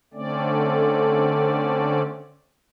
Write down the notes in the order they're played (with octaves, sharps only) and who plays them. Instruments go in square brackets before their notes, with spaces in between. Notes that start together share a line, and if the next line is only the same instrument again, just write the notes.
[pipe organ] D3 A3 C4 C#4 D5